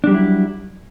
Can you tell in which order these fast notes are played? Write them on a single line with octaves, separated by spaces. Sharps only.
D4 G3 F#3 E4